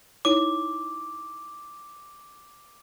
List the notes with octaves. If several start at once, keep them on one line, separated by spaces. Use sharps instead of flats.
D#4 E4 C#5 D6